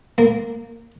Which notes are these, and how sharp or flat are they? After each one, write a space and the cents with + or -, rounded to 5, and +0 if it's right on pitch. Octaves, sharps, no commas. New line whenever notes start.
A#3 -15